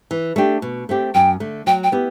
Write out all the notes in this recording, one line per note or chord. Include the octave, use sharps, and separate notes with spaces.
E3
A3 D4 G4
B2
A3 C4 G4
F#2 G5
D3 A3
F#3 G5
G5
B3 E4 G4